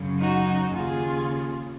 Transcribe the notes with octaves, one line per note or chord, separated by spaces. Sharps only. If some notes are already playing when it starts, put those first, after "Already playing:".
Already playing: F#2 C#3
D#4 F#4
D#2 C#3 F4 G#4